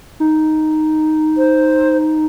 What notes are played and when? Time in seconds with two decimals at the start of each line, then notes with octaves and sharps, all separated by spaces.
0.20 D#4
1.37 C5